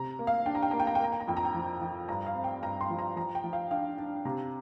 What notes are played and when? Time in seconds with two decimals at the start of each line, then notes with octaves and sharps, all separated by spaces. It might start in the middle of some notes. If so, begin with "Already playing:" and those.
Already playing: C3 A#5
0.19 A#3
0.27 F5
0.46 D4 G5
0.55 A#5
0.63 G5
0.71 A#3 A#5
0.80 G5
0.87 A#5
0.95 G5
1.00 A#3 A#5
1.12 G5
1.20 A#5
1.28 F2 G5
1.37 A#5
1.45 G5
1.54 F3
1.81 F3
2.09 G2 A#5
2.26 F5
2.35 C4
2.44 G5
2.62 G2 A#5
2.81 C6
2.90 F3
2.99 A#5
3.16 F3 A#5
3.35 G5
3.44 F3
3.53 F5
3.71 D4 F5
3.98 D4
4.25 C3 A#5